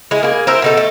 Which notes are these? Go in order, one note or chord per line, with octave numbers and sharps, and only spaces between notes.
G#3 E4
A#3 G#4
E4 A#4 C5
B2 D#4 A4
A3